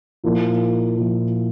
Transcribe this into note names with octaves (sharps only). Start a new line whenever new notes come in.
A#2 F3 A#3 E4
A#2 F3 A#3 E4